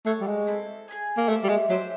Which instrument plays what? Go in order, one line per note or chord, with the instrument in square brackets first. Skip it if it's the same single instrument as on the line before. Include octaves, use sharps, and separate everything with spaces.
[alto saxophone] A3 [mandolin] G#4 C#5 F#5 A5
[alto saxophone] G3
G#3
[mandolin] C4 E4 A4
G#4 B4 D#5 G#5
[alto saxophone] A#3
[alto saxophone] A3 [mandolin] G4 C5 E5
[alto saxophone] G3
G#3
[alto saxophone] F#3 [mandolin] D4 G4 C5 E5